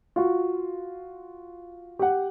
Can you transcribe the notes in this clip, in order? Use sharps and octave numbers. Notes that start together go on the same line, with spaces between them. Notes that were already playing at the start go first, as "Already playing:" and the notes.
F4 F#4
G4 F#5